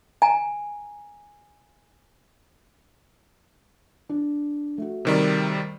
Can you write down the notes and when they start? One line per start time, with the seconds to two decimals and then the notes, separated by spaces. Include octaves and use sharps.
0.22 G#5 A#5
4.09 D4
4.78 A3 F#4
5.05 C3 D#3 G3